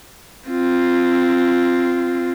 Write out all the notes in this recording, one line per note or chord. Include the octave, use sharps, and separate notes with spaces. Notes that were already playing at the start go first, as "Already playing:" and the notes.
C4 F4